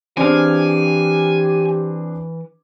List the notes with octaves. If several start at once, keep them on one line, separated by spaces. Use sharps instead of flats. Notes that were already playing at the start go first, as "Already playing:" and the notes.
E3 C4 D4 G4 G#4 F5 G#5